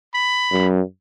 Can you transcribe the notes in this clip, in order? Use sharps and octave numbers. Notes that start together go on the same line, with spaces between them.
B5
F#2